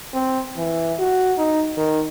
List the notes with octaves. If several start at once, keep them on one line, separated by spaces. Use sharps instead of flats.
C4
E3
F#4
D#4
D#3